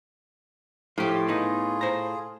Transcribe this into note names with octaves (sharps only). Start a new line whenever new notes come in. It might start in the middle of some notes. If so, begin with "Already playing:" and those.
A2 F3 G4 C6
B3 D#4 F4 G#4
C5 A#5